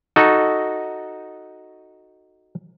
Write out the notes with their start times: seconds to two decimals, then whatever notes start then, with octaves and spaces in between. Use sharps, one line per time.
0.16 D#4 F#4 A4